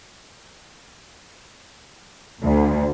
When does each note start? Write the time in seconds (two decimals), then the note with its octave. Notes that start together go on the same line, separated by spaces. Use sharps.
2.43 D2